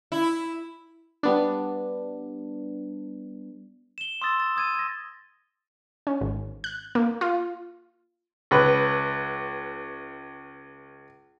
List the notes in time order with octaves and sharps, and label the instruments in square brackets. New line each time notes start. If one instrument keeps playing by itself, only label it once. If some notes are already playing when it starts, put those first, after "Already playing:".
[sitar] E4
[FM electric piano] G3 B3 D4
[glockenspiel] E7 G7
C6 D#6 E6 A6
A6
D#6 E6 G#6 A6 D#7
G#6 A#6
[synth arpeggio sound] C#4
G#1
F#6
A#3
F4
[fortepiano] C#2 B4